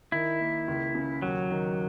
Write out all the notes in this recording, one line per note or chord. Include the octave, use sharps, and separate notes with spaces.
D#3 E4
A#3
C#2
C#3
D#2 F#3
D#3